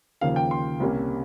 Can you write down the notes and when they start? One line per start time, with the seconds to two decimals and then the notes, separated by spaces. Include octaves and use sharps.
0.21 D#2 C#3 F3 A#3 F5
0.36 G5
0.51 C6
0.80 C2 C3 G3 A#3 C#4